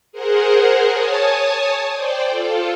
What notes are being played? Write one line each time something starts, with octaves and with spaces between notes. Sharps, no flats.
G#4 A#4 C5 F#5
C#5 G#5 A5 D#6
C5 D5 G5
F4 A4